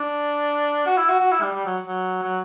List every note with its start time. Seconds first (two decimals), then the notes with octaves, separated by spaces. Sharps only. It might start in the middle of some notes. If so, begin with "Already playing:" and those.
Already playing: D4
0.86 F#4
0.97 E4
1.09 F#4
1.20 F#4
1.31 E4
1.42 G3
1.53 G3
1.65 F#3
1.87 F#3
2.23 F#3